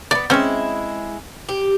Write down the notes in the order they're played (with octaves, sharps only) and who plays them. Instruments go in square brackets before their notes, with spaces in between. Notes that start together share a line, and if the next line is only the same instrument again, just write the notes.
[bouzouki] A3 B3 [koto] D5
[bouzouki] G#3 E4 [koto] C4 C#4
[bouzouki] G4